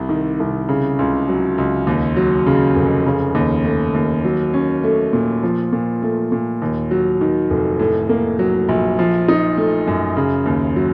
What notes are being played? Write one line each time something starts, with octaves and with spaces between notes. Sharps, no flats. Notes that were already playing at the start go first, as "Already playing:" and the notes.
Already playing: C2 C3
D#3
C2
C#3
C#2
F#3
C#2
D#2
F#3
C#3
F1
C#3
D#2
A3
D#2
F#3
C#4
A3
A#2
F3
A#2
A3
A#2
D#2
F#3
D#3
F1
A2
A#3
F#3
A#1
F3
D#4
A3
F#2
C#3
D#2
F#3